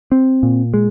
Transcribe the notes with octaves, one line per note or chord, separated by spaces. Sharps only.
C4
A#2
G#3